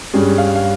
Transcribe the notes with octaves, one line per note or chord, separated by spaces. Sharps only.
G2 G3 C#4 G#4
F5
F5